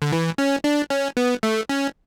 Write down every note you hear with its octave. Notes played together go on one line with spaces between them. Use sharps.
D3
E3
C#4
D4
C#4
B3
A3
C#4